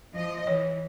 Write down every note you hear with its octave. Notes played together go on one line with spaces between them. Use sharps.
F3 D#5
E3 C#5